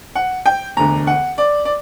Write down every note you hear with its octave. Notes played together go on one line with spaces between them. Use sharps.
F#5
G5
E1 D2 D3 A#5
F#5
D5
D5